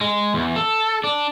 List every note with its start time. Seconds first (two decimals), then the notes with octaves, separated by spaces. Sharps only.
0.01 G#3
0.34 E2
0.56 A4
1.04 D4